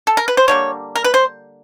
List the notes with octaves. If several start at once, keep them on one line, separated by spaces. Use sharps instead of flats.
A4
A#4
B4
C5
D3 G3 A#3 C#5
A#4
B4
C5